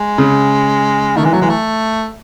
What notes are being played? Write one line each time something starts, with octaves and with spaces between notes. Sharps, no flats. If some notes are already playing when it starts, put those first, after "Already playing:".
Already playing: G#3
C#3
D#3 A3
E3 G#3
F#3 A3
E3 G#3
A3